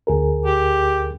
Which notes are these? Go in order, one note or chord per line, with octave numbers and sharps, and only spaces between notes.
D2 G#4 A#4
G4